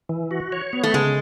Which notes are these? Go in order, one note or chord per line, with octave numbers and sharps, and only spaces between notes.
E3
F#4
C#5
B3
A3
C#3 G#3